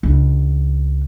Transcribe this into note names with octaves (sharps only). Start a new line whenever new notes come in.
C#2 D4